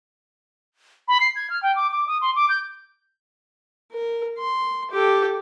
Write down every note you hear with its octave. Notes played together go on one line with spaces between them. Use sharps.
B5
C7
G#6
F6
G5
D6
D6
D#6
C6
D6
G6
A#4
C6
G4 A4